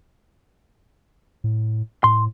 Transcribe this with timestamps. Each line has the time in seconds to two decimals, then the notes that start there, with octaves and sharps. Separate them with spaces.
1.44 A2
2.04 A2 C6